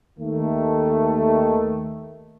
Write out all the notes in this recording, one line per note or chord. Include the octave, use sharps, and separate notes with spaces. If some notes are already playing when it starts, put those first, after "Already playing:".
D#2 D#3 A3